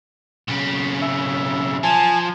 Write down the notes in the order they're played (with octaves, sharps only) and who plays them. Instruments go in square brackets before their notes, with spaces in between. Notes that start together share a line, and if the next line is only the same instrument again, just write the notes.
[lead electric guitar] B1 C#3
[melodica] E5
[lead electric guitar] F3 [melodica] G#5 A5